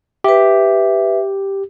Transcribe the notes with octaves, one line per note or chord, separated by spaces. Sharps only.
G4 B4 E5